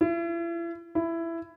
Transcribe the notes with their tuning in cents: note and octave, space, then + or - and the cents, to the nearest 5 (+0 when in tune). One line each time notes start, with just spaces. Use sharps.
E4 +40
E4 +15